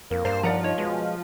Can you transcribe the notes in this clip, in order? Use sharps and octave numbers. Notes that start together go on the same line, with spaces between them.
F2 A#3
G2 C5 D5 F5 A#5
D#2 F3 D5 F#5 A#5
D#4 F4 C#5
B2 G#3